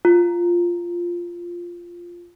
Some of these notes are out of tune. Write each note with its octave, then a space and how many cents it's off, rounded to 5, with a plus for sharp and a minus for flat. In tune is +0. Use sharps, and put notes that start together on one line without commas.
F4 -5